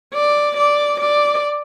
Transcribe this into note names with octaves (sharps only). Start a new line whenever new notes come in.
D5
D5
D5